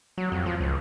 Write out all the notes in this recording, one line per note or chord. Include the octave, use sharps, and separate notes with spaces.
F#3
F2
F3
C#2